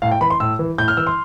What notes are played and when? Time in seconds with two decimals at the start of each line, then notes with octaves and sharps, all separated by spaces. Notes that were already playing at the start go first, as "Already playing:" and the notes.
0.02 A2 F5
0.11 G5
0.21 E3 B5
0.30 C6
0.40 A2 E6
0.59 E3
0.78 A2 G6
0.88 F6
0.97 E3 E6
1.07 C6